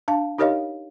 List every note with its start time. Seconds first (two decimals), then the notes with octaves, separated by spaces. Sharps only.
0.08 D4 F5 A5
0.38 D#4 G4 A#4 C#5 D#5 F5